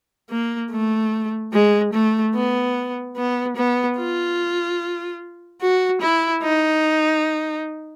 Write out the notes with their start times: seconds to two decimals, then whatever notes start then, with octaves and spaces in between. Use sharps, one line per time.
0.30 A#3
0.71 A3
1.53 G#3
1.93 A3
2.35 B3
3.17 B3
3.57 B3
3.97 F4
5.61 F#4
6.01 E4
6.42 D#4